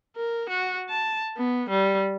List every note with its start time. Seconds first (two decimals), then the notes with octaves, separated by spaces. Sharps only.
0.16 A#4
0.50 F#4
0.90 A5
1.37 B3
1.70 G3